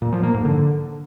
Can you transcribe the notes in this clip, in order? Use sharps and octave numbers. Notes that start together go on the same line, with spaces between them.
A#2
F3
A#3
G#2
D3